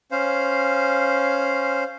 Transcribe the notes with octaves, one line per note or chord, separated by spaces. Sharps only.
C#4 C5 F5